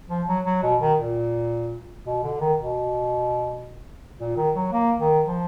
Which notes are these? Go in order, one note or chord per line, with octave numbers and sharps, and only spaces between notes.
F3
F#3
F#3
B2
D#3
A#2
B2
D3
D#3
B2
A#2
D#3
F#3
A#3
D#3
F3